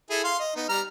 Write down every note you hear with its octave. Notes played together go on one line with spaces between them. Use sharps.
E4 G#4 A4
F5 C6
D#5
B3 D#4
G3 A#5 F6